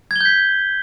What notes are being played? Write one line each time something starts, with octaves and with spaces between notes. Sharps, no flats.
G6 G#6 B6 G7